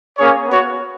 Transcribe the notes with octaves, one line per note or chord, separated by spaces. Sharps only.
A#3 C#4 G#4 C#5
B3 F#4 C#5